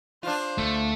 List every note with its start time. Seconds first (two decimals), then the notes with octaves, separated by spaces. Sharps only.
0.23 D4 F4 C5
0.58 D2 A3